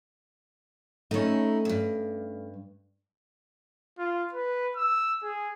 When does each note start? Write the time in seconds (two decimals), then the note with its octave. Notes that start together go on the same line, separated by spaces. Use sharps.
1.11 A3 C#4 D#4 E4
1.65 E2 G2
3.98 F4
4.33 B4
4.76 E6
5.23 G#4